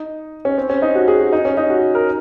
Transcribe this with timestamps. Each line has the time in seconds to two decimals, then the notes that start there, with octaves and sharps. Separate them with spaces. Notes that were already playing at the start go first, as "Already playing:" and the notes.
Already playing: D#4
0.45 C#4
0.58 C4
0.70 C#4
0.82 D#4
0.95 F#4
1.08 G#4
1.20 F#4
1.32 D#4
1.45 C#4
1.57 D#4
1.70 F#4
1.95 A#4